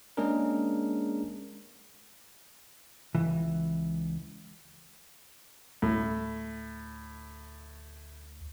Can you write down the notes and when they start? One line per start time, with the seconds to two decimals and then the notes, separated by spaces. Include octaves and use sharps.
0.17 G#3 A#3 C#4 D4 G#4 A#4
3.15 C#2 E3
5.82 D2 A2